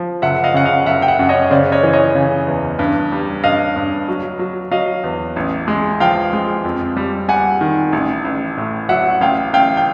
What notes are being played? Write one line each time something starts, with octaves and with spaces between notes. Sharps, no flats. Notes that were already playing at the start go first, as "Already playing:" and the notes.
Already playing: F3
F#1 E5 F#5
D#5 F5
C#3 F#5
D#5 F5
F#1 E5 F#5
G5
E5 F#5
F#2
C#5 D#5
C#3 C5 D5
C#5 D#5
E3
C#5 D#5
C#3
E2
G2
G3
G2 D#5 F5
G2
F#3
F#3
F#3 D#5 F5
E2
A1
G#3
F3 F5 G5
G#3
F2
G3
G3 F#5 G#5
D#3
A1
A1
A2
F#3 E5 F#5
A1 F5 G5
A1 F5 G5
G5